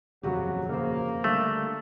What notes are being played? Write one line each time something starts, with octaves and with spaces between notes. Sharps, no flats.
D#1 F2 C#3 F#3 F#4 G4
C#3 A#3 C5
D3 G3 A3 E5